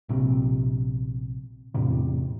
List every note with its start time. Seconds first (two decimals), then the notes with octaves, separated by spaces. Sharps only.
0.09 A#1 C3
1.74 E2 A2 C3